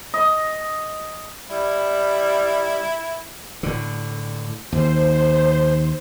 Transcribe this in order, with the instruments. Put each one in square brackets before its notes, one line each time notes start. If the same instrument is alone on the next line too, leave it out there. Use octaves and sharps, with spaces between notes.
[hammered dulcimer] D#5
[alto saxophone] G3 [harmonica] E4
[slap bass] A2 D3
[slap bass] D#2 [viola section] C5